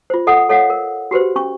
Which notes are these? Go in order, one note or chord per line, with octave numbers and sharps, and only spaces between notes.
F4 C5
A4 D#5 F#5 D#6
A4 C#5 D#5 F5 F#5
A#4
F#4 G4 B4 C5
C#4 C#6